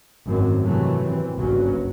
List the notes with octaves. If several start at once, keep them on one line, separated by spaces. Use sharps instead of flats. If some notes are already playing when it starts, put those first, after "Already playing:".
G#1 F#2 A2 D#3 F#3 C4
A2 C3 D#3 E3 F#3 A3
E3 C4
F#1 B1 G2 B2 F#3 C#4